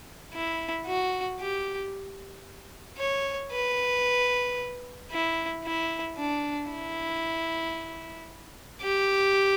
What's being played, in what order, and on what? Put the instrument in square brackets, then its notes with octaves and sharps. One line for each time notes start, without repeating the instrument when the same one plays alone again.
[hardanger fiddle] E4
F#4
G4
C#5
B4
E4
E4
D4
E4
G4